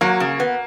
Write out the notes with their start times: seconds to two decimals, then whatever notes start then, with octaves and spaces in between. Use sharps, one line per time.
0.01 F#3 A#3
0.20 C#3
0.40 B3